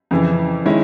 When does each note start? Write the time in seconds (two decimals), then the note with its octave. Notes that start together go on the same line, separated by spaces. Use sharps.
0.11 F2 C#3 E3
0.65 D#3 G#3 C#4 E4